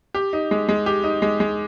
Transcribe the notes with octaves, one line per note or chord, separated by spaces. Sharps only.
G4
D#4
G#3
G#3
G4
D#4
G#3
G#3